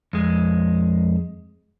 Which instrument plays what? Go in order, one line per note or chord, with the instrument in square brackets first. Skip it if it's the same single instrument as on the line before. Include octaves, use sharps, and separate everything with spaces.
[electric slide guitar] F2 G#3